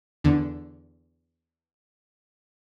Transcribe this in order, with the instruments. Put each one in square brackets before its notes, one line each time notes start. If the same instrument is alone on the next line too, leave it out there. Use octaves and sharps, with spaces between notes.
[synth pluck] E2 D3